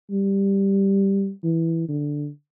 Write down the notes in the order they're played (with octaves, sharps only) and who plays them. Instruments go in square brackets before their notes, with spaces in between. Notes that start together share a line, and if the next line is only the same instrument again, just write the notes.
[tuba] G3
E3
D3